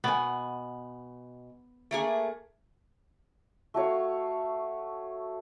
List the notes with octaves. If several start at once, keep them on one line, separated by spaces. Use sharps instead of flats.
B2 B3 G#5
A3 A#3 G#4
A3 F#4 C#5 F5